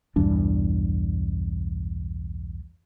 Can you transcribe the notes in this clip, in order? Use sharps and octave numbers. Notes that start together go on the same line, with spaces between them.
B1 E2 G2 D4